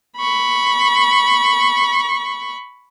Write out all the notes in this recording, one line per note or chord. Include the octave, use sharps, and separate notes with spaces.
B5 C#6